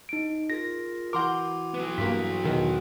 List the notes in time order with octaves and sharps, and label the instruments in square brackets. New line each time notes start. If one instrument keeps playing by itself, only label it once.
[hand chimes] D#4 D7
[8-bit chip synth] F4 G#4 A#4 [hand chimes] A#6
[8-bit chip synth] E3 E4 F#4 [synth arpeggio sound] A#4 G6 [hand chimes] F#5 C6 D6
[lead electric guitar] F#3 B3
[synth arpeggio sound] G2 A#3 [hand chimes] B6
[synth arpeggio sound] E2 B2 D#3